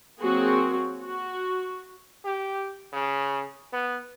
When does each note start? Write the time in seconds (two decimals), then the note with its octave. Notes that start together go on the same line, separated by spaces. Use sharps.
0.21 F#3 A#3 C4 F#4 G#4
1.02 F#4
2.25 G4
2.93 C#3
3.73 B3